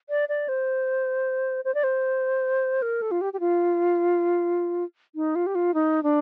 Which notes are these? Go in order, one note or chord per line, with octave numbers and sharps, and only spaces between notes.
D5
D5
C5
C5
D5
C5
A#4
A4
F4
G4
G4
F4
D#4
F4
G4
F4
D#4
D4